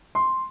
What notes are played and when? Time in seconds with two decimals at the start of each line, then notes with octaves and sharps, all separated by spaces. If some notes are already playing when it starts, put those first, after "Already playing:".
0.15 C6